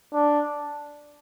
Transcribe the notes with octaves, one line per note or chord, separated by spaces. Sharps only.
D4